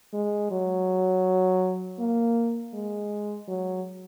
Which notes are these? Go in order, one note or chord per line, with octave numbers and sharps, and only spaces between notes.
G#3
F#3
A#3
G#3
F#3